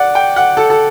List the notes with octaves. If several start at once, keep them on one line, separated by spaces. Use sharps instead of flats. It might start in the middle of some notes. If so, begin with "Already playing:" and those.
Already playing: D5 F#5
G5
F#5
A4
A4